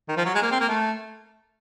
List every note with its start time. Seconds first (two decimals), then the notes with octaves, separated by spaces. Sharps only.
0.08 D#3
0.17 F3
0.25 F#3
0.35 G#3
0.43 A#3
0.51 C4
0.60 A#3
0.69 A3